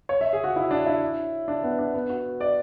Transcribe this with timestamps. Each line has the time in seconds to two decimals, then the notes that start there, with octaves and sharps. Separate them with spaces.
0.09 C#5
0.21 E5
0.33 G#4
0.44 F#4
0.56 E4
0.71 D4
0.86 E4
1.48 D4
1.63 B3
1.79 D4
1.94 B3
2.10 F#4
2.40 D5